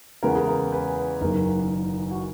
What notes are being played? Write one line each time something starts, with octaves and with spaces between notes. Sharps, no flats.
E2 C#3 G#3 B3 A#4
G#4
A#4
B4
F#1 F#2 D#3 A#4
F#4